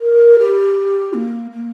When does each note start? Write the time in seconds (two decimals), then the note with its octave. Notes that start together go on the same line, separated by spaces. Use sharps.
0.01 A#4
0.39 G4
1.13 A#3
1.51 A#3